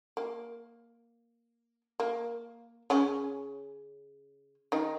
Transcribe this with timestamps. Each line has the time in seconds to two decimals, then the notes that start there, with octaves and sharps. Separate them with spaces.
0.17 A#3
2.00 A#3
2.90 C#3 C#4
4.72 D#3 D#4